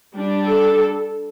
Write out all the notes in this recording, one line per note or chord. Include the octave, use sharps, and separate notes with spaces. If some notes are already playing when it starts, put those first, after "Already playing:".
G3 D4
A4